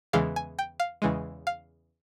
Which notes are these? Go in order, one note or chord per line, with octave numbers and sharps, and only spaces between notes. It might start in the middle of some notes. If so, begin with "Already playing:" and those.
E2 C#3 E3 G#3 F5
G#5
G5
F5
E2 C#3 E3 G#3
F5